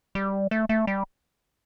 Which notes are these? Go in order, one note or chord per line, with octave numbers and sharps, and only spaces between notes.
G3
A3
A3
G3